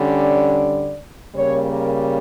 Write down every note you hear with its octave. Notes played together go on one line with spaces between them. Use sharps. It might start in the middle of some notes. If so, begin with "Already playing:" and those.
Already playing: D3 G3 C#4
D5
C#3 G3 A#3 C#5
A#4